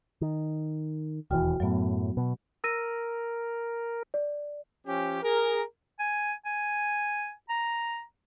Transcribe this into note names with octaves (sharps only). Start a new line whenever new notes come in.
D#3
E1 D#2 E3 F#4 G5 F6
F#2 A2 F#3 B3
B2
A#4 E6 A#6 D#7
D5
F3 C#4 G4
G#4 A#4
G#5
G#5
A#5